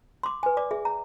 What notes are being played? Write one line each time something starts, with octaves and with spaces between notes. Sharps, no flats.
C6 D6
B4 G#5
D5 D6
G#4 E5
A#5